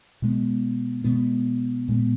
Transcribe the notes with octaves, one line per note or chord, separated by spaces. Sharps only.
B2 G#3 B3
B2 G#3 B3
A#2 G#3 B3